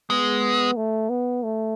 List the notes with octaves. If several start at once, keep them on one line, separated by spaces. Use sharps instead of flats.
G#3 B3
A3
B3
A3